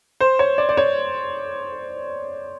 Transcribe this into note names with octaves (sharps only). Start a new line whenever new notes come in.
C5
C#5
D5
D5
C#5